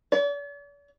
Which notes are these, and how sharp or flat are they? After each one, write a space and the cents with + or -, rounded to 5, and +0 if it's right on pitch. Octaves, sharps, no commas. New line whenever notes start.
D5 -45